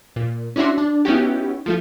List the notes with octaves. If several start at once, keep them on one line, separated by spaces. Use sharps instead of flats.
A#2
C#4 D4 E4 F#4 C6
D4
B3 C#4 D#4 E4 F#4 G4
F3 A3 F4